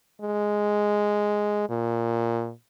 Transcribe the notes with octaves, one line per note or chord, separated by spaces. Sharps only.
G#3
A#2